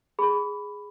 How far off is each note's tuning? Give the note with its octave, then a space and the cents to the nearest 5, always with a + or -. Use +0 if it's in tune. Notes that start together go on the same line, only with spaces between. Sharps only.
G#4 +0 B5 +5